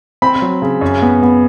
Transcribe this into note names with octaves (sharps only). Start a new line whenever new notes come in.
C4 B5
F#3
C#3
F#2
B3
B3